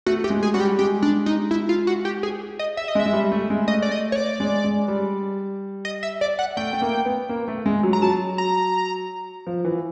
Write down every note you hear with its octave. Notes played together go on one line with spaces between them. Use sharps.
A3 F#4
G4
G#3
G#4
G3 F#4
G4
G#3 G4
D4
D#4
E4
F4
F#4
G4
G#4
D#5
E5
D#5
G#3
E5
G#3
G3
A3
G#3
A3 D#5
D5
D#5
C#5
D5
G#3
G#3
G3
D#5
E5
D5
F#5
A3 G5
A3
A#3
B3
A#3
A3
G#3
F#3
A#5
F#3 A5
A#5
F3
E3